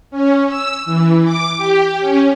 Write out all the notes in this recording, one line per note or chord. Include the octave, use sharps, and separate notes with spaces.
C#4
E6
E3
D6
G4
C#4